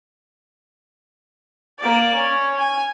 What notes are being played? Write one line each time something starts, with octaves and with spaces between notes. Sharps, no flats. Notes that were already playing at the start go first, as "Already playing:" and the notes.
A#3 D5
C#4
G#5